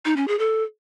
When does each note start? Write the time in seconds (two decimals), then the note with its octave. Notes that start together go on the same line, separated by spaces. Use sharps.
0.05 D#4
0.16 C#4
0.28 G#4
0.39 A4